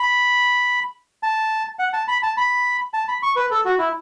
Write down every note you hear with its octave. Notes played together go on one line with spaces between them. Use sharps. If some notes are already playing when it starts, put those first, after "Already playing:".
Already playing: B5
A5
F#5
A5
B5
A5
B5
A5
B5
C#6
B4
A4
F#4
E4